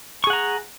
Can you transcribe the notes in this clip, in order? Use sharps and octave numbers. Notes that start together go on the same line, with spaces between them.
G#4 F#5 A#5 C#6